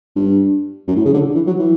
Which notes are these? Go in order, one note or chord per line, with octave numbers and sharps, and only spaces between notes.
G2
F#2
A2
C#3
D3
E3
F#3
E3